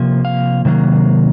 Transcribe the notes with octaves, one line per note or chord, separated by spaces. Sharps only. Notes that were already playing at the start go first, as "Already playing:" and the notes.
Already playing: C3 F3 A#3
F5
C3 D#3 F#3 A#3